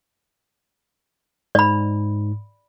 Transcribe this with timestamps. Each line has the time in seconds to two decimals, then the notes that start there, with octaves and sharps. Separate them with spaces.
1.55 G#2 D5 B5